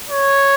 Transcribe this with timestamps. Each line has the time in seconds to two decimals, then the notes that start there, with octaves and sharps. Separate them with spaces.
0.09 C#5